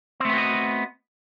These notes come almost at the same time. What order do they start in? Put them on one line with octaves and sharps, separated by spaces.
C4 A3 B3 F#4 D#5